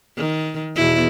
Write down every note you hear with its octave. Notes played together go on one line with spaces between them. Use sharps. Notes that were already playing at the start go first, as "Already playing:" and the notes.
D#3
E2 B2 E4